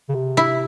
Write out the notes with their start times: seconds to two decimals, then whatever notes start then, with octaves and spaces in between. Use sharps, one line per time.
0.09 C#3
0.14 C3
0.37 E4